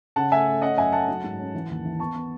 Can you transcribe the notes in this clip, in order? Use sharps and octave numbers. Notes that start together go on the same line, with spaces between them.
C#3 F#5 A5
A3 E5 G#5
A3
C#4 D#5 F#5
F#2 E5 G#5
A3 F#5 A5
F#3
G#2
C#4
E3
D#2
E3
B3 A5 C#6
B3